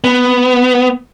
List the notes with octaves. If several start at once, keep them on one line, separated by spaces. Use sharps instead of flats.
B3